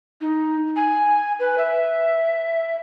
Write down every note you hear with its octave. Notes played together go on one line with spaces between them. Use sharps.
D#4
G#5
B4
E5